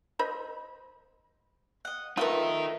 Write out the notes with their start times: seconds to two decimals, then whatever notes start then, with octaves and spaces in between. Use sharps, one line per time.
0.19 C5 D#5 B5
1.85 D#5 F#5
2.17 A3 B3 D#4 F4 A#4 B4 E5